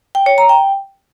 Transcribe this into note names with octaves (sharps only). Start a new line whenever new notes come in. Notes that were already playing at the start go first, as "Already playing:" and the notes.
G5
C#5
A#5
G5